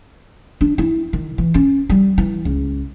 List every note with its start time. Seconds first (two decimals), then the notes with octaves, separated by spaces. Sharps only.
0.61 D4
0.78 E4
1.13 D#3
1.38 E3
1.54 C#4
1.89 G3
2.18 E3
2.45 C#2